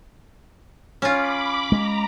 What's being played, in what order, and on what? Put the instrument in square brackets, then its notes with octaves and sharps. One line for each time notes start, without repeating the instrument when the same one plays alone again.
[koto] C#4 F4 [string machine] B5 D6
[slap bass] G#3 [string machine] A#5